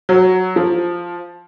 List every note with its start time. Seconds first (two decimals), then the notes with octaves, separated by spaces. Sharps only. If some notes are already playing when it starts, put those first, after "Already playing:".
0.09 F#3
0.56 F3